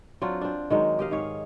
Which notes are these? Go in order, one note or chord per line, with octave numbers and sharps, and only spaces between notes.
F#3 C4 D4 F4
C4 D4
D#3 F#3 G#3
G4 D#5 F5
G#2 G#4 C#5